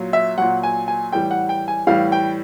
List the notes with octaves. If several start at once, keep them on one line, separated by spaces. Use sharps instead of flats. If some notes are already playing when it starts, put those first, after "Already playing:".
Already playing: A#2 F#3
E5
A#2 F#3 F#5
G#5
G#5
A2 E3 G3 G5
F#5
G5
G#5
A2 E3 G3 F5
G5